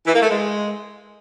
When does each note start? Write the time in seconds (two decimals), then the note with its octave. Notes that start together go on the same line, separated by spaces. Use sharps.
0.07 E3
0.15 A#3
0.22 A3
0.30 G#3